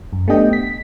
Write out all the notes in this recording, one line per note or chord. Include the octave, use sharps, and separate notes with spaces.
F#2
A3 B3 D4 G4 D#5 G5
B6